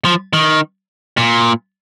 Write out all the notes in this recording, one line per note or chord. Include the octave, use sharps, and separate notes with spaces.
F3
D#3
A#2